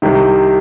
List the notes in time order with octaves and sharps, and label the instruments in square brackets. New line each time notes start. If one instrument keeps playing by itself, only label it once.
[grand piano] C2 C3 D#3